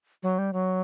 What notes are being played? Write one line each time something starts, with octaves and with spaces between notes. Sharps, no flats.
F#3
G3
F#3